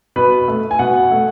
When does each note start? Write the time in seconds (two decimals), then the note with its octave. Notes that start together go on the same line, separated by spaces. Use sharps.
0.16 B2 B4
0.48 A3
0.71 G#5
0.79 B2 F#5
1.11 A3